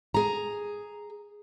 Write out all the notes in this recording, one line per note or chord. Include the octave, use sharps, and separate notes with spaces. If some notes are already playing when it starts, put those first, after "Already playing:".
G#4 A#5